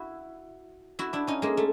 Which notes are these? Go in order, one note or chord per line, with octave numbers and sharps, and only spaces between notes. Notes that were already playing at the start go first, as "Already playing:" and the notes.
Already playing: E4 F#4
E4 F#4
D4 E4
C#4 D#4
G#3 A#3
A3